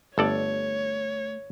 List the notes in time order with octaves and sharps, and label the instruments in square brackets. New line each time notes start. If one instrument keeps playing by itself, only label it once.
[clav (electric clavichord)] G1 A4 D5 [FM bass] A3 [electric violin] C#5